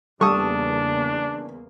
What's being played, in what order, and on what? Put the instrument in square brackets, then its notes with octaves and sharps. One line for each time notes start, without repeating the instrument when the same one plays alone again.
[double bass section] E2 C#3 A#3 [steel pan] G3 A4 [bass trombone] D4 [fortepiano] C#6 D#6